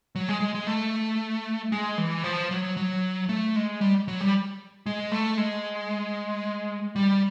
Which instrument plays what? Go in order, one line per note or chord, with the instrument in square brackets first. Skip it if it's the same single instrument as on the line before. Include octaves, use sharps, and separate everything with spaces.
[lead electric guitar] F#3
G#3
G#3
G#3
A3
G#3
E3
F3
F#3
F#3
A3
G#3
G3
F#3
G3
G#3
A3
G#3
G3